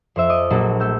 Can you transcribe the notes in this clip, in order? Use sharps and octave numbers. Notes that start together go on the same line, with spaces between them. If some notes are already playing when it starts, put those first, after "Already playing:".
F2 C5 E5
D#5 D6
A#1 F#3 A#3 F#4 A4
A3 E6 G6